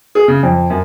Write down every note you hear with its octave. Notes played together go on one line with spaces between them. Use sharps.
G#4
C#3
F2
F#2